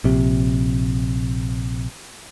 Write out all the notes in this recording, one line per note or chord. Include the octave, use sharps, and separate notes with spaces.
A#1 C3